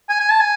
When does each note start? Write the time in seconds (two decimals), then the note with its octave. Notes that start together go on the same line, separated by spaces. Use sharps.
0.09 G#5
0.20 G#5
0.30 A5
0.40 G#5